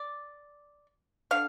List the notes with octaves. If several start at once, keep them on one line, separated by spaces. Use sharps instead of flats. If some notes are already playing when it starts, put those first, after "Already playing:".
Already playing: D5
D3 F5